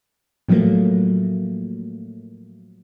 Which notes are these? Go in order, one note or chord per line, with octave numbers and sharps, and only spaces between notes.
A2 F3 F#3 A3 A#3